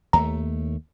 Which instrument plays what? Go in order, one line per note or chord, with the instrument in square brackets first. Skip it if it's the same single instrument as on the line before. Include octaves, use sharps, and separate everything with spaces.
[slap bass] D#2 A3 [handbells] A#5